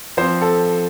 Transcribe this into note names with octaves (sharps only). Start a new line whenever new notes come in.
F3 C4 C5
A4